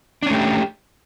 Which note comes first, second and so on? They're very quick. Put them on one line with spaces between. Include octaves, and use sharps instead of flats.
D4 C#4 A3 G4